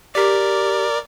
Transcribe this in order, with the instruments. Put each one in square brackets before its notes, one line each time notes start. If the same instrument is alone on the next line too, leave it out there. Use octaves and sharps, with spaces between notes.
[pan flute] G4 [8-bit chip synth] A#4 D5